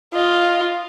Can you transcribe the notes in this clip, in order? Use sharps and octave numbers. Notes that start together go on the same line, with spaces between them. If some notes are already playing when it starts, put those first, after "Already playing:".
F4 D#5